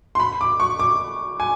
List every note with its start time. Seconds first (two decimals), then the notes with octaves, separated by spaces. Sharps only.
0.15 C6
0.20 B5
0.41 D6
0.60 C#6
0.79 D6
1.40 G#5